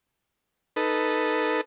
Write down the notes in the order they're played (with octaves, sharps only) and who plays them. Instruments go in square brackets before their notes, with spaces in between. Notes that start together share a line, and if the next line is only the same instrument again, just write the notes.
[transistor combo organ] D#4 A4 B4